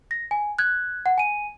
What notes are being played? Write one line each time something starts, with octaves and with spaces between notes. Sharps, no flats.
A#6
G#5
F#6 G#6
F#5
G#5 D#7